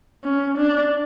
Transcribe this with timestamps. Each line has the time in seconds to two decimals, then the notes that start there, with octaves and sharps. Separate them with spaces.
0.24 C#4
0.58 D4